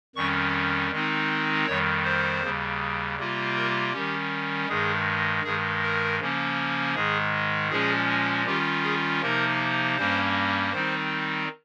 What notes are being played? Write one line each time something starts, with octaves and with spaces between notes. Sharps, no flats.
F2 D#3 G3 C#4 C#6
D#3 G#3 C4 D#4
F2 D#3 G3 C#5
C5
D#2 C#3 G3
C3 G3 A#3 F4
A#4
D#3 G3 C#4 G4
G2 D#3 G#3 G#4
G2 D#3 G#3 G#4
A#4
C#3 F3 A#3 C#4
G#2 D#3 G#3 G#4
A#2 F3 G#3 C#4 G#4
D#3 G3 C#4 F4 G4
G#4
C3 F3 A#3 D#4 A#4
G2 G3 A#3 C#4 C5
D#3 G3 C4 D#4 C5